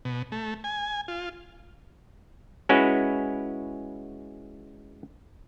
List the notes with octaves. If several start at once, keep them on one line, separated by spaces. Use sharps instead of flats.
B2
A3
G#5
F4
G#3 C#4 E4 F#4 B4